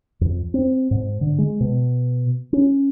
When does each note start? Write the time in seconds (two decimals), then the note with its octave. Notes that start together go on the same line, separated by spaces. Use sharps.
0.21 F2
0.54 C4
0.91 G#2
1.21 D3
1.38 G#3
1.60 B2
2.53 C#4